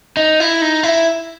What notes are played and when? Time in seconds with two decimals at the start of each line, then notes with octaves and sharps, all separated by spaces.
0.17 D#4
0.40 E4
0.62 D#4
0.83 E4